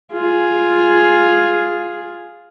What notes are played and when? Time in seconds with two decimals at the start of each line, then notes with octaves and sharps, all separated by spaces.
0.13 F4 G#4